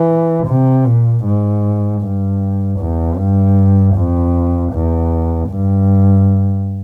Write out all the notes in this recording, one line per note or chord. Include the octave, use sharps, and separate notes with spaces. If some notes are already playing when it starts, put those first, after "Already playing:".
Already playing: E3
C3
A#2
G#2
G2
E2
G2
F2
E2
G2